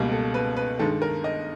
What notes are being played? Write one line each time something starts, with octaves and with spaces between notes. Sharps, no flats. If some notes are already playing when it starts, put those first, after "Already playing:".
Already playing: C#2 B2 G3 A#3
A4
B4
B4
G2 D#3 G#3 A4
A#4
D#5